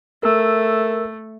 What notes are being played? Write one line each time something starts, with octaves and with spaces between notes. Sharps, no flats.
A3 A#4 E6